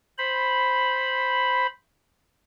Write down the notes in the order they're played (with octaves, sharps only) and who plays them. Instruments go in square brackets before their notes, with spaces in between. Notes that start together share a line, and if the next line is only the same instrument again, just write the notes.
[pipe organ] C5 B5